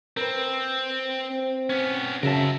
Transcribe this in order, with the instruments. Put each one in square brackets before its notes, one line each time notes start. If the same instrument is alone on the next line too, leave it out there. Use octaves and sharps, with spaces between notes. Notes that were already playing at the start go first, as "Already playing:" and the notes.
[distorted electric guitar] C4 [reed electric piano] A#4 B4
[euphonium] C4
[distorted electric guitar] B3 C#4
[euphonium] F#2 [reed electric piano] C#3 A5 [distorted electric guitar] A#4 E5